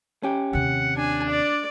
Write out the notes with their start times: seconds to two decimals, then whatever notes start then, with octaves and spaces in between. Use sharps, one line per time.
0.23 C#4 G4
0.53 D#2 C3 F#5
0.96 D4 G#5
1.29 D5